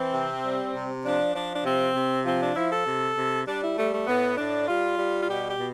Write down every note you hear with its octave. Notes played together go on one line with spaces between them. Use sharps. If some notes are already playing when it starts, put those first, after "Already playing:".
Already playing: E3 C4
C3
G3
C3
F3 D4
F3 D4
D4
C3 C4
C3
F3 C4
D4
F3 E4
A4
C3
C3
G3 D4
E4
G3 A3
A3
A2 B3
A2 D4
G3 F4
G3
F4
B2 G4
G4
B2